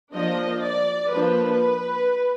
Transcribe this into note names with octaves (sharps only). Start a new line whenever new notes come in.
F3 A#3 D4 D#5
D5
F3 A#3 D4 B4